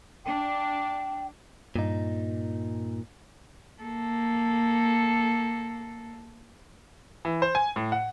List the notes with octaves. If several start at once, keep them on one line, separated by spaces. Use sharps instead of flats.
D4 G5
G2 A#2 D#4
A#3 A4
E3
C5
G#5
A2
F#5